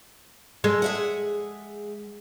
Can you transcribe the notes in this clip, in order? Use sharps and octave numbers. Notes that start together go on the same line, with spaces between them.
G#3 A4
G#4 E5 F#5